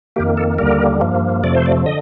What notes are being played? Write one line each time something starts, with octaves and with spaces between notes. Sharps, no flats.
F2 D#3 A#3 G4
A4
D#2 D3 G3 A#3 A#4
G2 F3 A#3
F2 C3 F3 A3 D5
C5
D5
D3 D#5